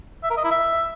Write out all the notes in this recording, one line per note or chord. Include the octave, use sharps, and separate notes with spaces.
E5
A#4
D#5
E4
E5